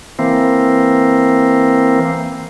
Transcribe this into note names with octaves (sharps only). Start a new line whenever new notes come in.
E3 A#3 C4